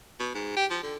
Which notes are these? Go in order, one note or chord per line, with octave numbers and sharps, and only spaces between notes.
B2
G#2
G4
F3
D3